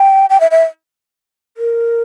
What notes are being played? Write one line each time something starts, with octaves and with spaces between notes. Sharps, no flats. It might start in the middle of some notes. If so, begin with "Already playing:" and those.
Already playing: G5
G5
E5
E5
A#4